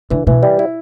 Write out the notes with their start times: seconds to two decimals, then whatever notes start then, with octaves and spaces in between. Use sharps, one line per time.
0.10 D3 E3
0.27 B2 E3
0.43 G3
0.59 E4